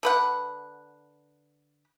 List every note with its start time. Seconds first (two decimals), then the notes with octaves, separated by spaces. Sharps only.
0.03 D3 B4 F#5